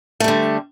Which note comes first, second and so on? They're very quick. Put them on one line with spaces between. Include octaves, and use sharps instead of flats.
A3 G3 D3